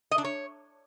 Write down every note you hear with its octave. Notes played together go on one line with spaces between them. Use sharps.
D#5
D4
C#5